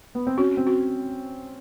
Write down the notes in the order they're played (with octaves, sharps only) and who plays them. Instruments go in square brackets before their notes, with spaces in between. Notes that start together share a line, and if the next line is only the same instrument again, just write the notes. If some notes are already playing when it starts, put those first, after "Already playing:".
[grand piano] B3
C4
[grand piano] C#4 [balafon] F#4
[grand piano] C4
[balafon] F#4